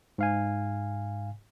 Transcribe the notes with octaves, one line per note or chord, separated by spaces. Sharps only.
G#2 F5 G#5